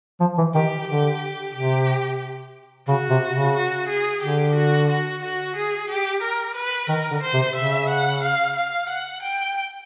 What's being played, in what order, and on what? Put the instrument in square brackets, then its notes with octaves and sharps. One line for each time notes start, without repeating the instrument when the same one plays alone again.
[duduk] F3
E3
[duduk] D#3 [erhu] G4
[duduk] D3 [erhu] G4
[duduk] C3 [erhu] G4
[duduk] C#3 [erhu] F#4
[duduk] C3
C#3
[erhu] F#4
G#4
[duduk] D3 [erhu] G4
[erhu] F#4
F#4
F#4
G#4
G4
A#4
B4
[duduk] D#3 [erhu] A#4
[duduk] D3
[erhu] C5
[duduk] C3
[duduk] C#3 [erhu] E5
[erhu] F#5
F5
F5
F#5
G5